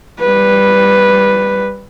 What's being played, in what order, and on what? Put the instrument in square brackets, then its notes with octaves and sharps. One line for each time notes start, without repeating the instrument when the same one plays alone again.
[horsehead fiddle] G3 B4